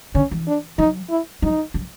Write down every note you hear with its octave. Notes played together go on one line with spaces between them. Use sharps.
D3 C#4
E3
D4
F#3 D#4
E4
F#3 D#4
F#3